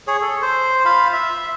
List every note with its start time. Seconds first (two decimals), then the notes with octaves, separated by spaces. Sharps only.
0.07 G#4 C#5
0.21 A4
0.42 C5
0.85 F4 F5 B5
1.13 E5